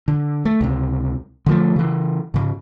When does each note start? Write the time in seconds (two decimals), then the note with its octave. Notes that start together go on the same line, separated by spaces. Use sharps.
0.08 D3
0.45 A3
0.61 C#2 C3
1.46 D3 F3 A3
1.76 C#3 E3
2.34 G#2 C#3